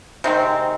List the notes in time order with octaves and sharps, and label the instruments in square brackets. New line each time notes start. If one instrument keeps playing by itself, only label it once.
[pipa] C3 D#3 G#3 C4